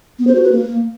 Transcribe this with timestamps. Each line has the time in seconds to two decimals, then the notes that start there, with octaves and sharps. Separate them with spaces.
0.19 B3
0.27 C5
0.35 F#4
0.44 B4
0.52 A#3